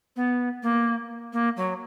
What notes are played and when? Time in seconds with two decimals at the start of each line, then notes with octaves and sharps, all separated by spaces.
0.16 B3
0.63 A#3
1.33 A#3
1.57 F#3